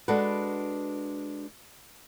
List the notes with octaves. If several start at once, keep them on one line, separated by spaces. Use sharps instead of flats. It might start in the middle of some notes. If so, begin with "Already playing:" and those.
G#3 D4 F#4 A4 B4